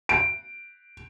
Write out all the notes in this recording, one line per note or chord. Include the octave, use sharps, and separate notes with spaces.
D7